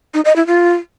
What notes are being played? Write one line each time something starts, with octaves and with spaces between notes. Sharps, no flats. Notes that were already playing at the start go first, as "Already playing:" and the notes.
D#4
D#5
E4
F4